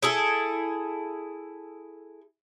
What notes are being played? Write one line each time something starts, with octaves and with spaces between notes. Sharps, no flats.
E4 G#4 A4